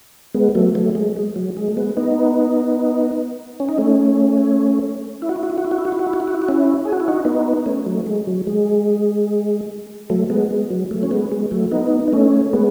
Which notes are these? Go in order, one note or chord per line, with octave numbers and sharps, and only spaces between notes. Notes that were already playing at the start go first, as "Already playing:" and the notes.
G#3 B3
F#3 A3
F#3 A3
G#3
G#3
F#3
G#3
A3
G#3 B3
B3 D#4
C#4
D#4
A3 C#4
E4
F#4
E4
F#4
E4
F#4
E4
F#4
E4
F#4
E4
F#4
E4
F#4
E4
F#4
E4
F#4
C#4 E4
G#4
F#4
E4
D#4 F#4
B3 D#4
A3 C#4
F#3 A3
G#3
F#3
G#3
F#3 A3
G#3 B3
G#3
F#3
F#3 A3
C#4
G#3 B3
G#3
F#3 A3
B3 D#4
D#4
A3 C#4
G#3 B3